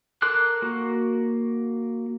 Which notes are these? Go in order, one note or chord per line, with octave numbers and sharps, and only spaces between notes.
A4 A#4 C6 D6 F#6
A#3 F#4